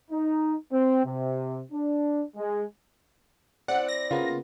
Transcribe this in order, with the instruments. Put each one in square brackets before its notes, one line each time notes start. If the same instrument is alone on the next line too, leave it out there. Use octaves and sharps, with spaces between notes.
[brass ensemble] D#4
C4
C3
D4
G#3
[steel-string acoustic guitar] C4 E4 [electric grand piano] D5 [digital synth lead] F#5
[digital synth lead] A#6
[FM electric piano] C#3 A#3 B3 [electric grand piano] F4